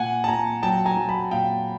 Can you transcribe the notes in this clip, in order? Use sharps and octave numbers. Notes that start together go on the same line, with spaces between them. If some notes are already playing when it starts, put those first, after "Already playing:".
Already playing: A#2 F#5 G#5
A5
A#2 G#5 A#5
F#3 G5 A5
G#5 A#5
F#3
A5 B5
A#2 F5 G5